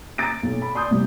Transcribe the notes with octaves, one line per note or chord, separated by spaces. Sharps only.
A#5 A6 D7
B1
B5
D5 C6 D#6 G6
C3 G3